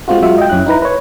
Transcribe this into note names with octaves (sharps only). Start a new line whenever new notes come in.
G#3 C4 F4 F#4
F#3 G#3 F4 F#4 E5
D#5 G5
F#2 C#4 E4 F#6
D#4 E4 B4 A#5
B4 C#5